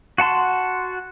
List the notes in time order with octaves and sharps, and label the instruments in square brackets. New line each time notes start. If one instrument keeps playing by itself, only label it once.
[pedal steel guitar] F#4 F#5 A5 C6